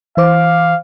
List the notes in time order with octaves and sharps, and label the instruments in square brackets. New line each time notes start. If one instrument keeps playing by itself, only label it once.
[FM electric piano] E3 C5 D6 [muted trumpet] F5